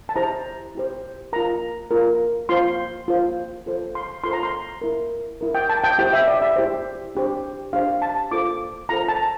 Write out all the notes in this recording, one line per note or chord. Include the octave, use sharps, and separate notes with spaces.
A5
E4 G4 C5 A#5
E4 G4 C5
F4 A#4 A#5
F4 A#4
F4 C5 C6
F4 C5
F4 A4 C5
C6
F4 A4 C5 C6
A#5
C6
E4 A#4
E4 A#4
G5
A5
G5
E4 G4 C5 G5
E5
D5
E5
E4 G4 C5
D4 G4 C5
D4 G4 C5 F5
A5
F4 A4 C5 D6
F4 A4 C5 A#5
A5